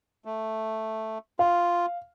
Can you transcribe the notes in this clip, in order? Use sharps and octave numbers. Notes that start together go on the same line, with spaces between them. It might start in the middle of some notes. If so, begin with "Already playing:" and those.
A3
F4 F5